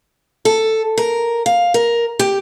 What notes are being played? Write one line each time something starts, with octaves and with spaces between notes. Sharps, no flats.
A4
A#4
F5
A#4
G4